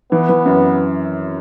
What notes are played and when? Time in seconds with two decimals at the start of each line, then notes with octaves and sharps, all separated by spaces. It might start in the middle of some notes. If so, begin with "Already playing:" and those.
0.12 E3 B3
0.29 E3
0.46 F#2